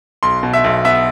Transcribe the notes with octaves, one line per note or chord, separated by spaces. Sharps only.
B1 C6
B2
E5
B1
B3 E5